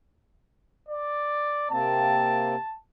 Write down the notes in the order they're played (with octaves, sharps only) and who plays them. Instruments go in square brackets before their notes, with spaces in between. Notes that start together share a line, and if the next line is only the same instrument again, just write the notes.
[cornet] D5
[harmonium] C3 A#3 C4 [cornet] A5